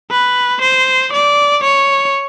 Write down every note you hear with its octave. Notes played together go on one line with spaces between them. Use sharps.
B4
C5
D5
C#5